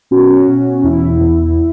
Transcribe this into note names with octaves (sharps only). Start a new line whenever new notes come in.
B2 C#4 F#4
B2
E2 E4
E2